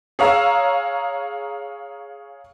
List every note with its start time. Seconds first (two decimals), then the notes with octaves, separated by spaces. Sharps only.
0.19 G#4 C#5 F5 A#5 E6